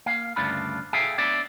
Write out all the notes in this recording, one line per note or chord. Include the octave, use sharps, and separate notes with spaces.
A#3 F5
D2 G2 C#3 D4 F4 B5
G#4 A4 E5 F5 G5 G#5
B3 D4 C#5 D5 E5